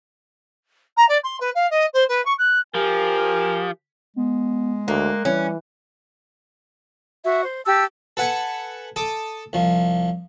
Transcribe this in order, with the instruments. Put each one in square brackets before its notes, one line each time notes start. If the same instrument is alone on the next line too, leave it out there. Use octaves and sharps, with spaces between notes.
[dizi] A#5
D5
C6
B4
F5
D#5
C5
B4
C#6
F#6
[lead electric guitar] F3 [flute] G4 [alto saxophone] A#4 [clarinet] G#5
[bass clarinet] G#3 [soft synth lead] B3
[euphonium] D2 [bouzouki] A#3 [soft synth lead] F#6
[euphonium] E3 [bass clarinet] G3 [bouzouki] C#4
[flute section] F#4 E5
C5
G4 A5 E6
[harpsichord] A4 B4 F#5 G#5
A4 D6 D#6
C2 F3